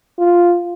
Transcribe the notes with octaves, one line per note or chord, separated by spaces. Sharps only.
F4